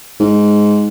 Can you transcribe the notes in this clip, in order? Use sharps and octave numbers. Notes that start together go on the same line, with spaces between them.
G#2